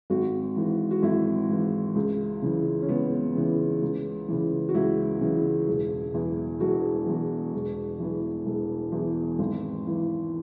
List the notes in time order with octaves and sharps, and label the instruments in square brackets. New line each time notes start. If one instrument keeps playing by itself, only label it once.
[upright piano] G#1 F#4
G#2 E3
F#4
G#1 E4
G#2 E3
C#2
C#3 E3
C#4
C#2 B3
C#3 E3
C#2
C#3 E3
F#4
C#2 E4
C#3 E3
E1
E2 E3
E1 F#4
E2 E3
E1
E2 E3
E1
E2 E3
G#1
E3